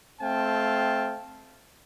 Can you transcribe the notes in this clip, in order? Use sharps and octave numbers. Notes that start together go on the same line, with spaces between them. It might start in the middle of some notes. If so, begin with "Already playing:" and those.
A3 C4 F5 G5 A5